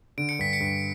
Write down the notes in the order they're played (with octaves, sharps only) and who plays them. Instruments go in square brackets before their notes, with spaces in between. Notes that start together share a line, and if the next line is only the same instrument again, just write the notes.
[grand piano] D3 [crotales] D7
[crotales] C#7
[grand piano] G2 [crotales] B6
[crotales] C#7
[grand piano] G2